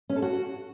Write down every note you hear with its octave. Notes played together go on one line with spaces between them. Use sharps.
C#4
A4
F#4